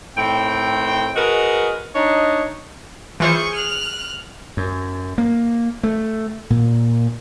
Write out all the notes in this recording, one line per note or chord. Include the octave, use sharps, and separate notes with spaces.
A2 D#3 C4 G5
F#4 G#4 A#4 B4 D#5
D4 D#4 C#5 D#5
E3 F4 G#4 C5 C#6 G6
F6 F#6
F#2
A#3
A3
A#2